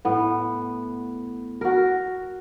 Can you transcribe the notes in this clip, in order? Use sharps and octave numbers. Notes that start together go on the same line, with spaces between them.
A2 B3
F#4 A#4